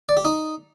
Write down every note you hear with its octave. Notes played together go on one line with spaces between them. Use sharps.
D5
G4
D#4